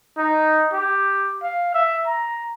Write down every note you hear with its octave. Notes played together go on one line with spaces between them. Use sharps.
D#4
G4
F5
E5
A#5